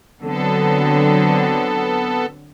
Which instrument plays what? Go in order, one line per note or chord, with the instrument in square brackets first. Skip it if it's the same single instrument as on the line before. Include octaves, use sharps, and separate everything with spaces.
[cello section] D3 F#3 C4 [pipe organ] B3 A4